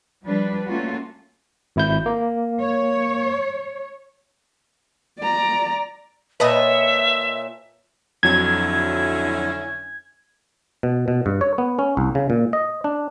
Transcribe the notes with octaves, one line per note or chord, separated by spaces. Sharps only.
F3 G3 D4 B4
A3 A#3 C#4 F4 F#4
G#1 E4 G6
A#3
C#5
D5 A#5
A#2 B4 C#5 D#5 E5 A5
F2 D3 F#3 C#4 E4 G#6
B2
B2
G2
C#5
B3
C#4
C2
C#3
A#2
D#5
D4